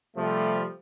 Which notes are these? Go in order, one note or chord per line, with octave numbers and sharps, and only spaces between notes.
C3 F3 G3 A3